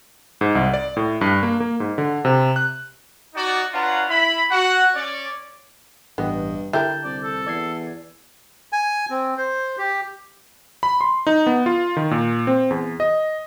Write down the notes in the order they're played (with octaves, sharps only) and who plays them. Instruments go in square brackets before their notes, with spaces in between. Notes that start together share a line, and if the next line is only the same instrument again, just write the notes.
[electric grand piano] G#2
C2
D5
A2
G2
A#3
A#3
G#2
D3
C3
F#6
[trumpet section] D#4 F#4 D5
D4 F4 B4 C#5 F#5 A#5
E4 B5
F#4 F#5
C#4 C#5 D5
[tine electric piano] A1 G4 D#5 [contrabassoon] G2 [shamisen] B3
[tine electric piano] D3 A5 G6 [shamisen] E4 G4 A#4
[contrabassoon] C2 [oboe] D5
[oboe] A4
[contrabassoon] E2 [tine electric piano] D5 G#6 C7
[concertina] G#5
C4
C5
G4
[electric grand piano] B5
C6
D#4
B3
F4
D#3
A#2
C4
E2
D#5